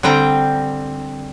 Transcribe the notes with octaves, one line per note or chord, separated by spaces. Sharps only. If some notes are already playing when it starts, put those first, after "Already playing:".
D3 G3 C4 G5 A#5